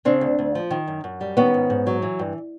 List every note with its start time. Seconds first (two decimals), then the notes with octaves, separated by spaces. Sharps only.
0.05 C#3 C4 D4
0.21 D2
0.39 D2
0.55 F3
0.71 D#3
0.87 F#2
1.04 F#2
1.21 G3
1.37 D#3 B3 C#4
1.54 G#2
1.70 G#2
1.87 F#3
2.02 E3
2.19 G2